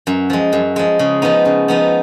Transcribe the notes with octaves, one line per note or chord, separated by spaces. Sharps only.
F#2
F3 G#3
F#2
F3 G#3
C#3
F3 B3 D#4
C#3
F3 B3 D#4